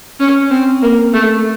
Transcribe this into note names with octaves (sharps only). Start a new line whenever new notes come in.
C#4
C4
A#3
A3